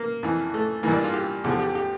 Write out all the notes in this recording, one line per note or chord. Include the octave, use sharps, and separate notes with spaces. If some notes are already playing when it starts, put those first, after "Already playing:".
Already playing: A#3
F2 E3
A3
G2 E3 A#3
D4
F4
G4
E2 D3 F3 G4
G4
G4